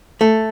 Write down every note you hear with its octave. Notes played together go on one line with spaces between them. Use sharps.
A3